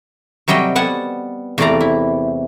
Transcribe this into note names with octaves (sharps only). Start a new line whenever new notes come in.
C3 F#3 G3 D#5 G5
G3 B3 F#5 G#5 A5
E2 C3 A3 D5 F5 A#5
E4